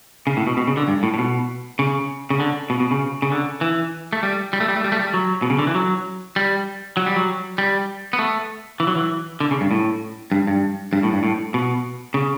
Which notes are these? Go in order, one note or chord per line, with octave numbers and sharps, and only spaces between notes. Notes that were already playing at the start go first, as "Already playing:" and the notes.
C#3
A2
B2
B2
C#3
D3
G2
A2
A2
B2
C#3
C#3
D3
B2
B2
C#3
C#3
D3
E3
A3
G3
G3
A3
G3
A3
G3
A3
G3
F#3
B2
C#3
D3
E3
F#3
G3
F#3
G3
F#3
G3
B3
A3
E3
F#3
E3
D3
C#3
G2
A2
G2
G2
G2
A2
G2
A2
B2
C#3